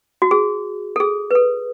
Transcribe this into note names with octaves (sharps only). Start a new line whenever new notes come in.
F#4
G#4
A4
G#4
B4
A4